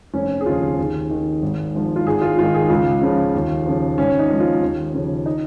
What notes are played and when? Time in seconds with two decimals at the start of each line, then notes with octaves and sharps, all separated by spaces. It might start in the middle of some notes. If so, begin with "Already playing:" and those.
0.14 F1 C#4
0.41 G#4
0.46 D#2 C#3 F3 F4
0.78 D#2 G#4
1.11 D#3
1.42 G#1
1.74 G#2 F3
1.96 F4
2.06 G#1 G#4
2.21 F4
2.37 G#2 D#3 F4
2.54 G#4
2.69 C#2 F4
3.01 C#3 F3
3.35 D#2
3.66 C#3 F3
3.98 G#1 C#4
4.19 D#4
4.30 G#2 F3
4.40 F4
4.63 D#2
4.93 C#3 F3
5.26 D#4